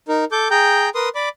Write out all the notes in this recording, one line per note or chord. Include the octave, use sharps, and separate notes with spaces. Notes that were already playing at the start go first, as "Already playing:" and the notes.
D#4 A#4
A4 D6 G6
G#4 G5 A#5 G6
A#4 B4 C6 D#6
D5 B5 D6